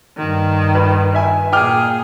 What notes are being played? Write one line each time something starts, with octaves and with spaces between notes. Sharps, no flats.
G2 D#3
B4
B4 E5 G#5
A#2 G#4 G5 D6 F6